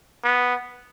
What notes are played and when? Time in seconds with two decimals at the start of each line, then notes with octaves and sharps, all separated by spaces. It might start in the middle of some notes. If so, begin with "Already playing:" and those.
0.24 B3